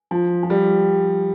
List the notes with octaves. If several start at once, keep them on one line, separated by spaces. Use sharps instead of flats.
F3
F3
G3